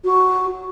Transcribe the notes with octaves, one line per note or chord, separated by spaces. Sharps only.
F#4